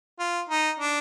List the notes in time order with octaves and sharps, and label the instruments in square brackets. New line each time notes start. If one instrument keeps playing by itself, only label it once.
[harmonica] F4
D#4
D4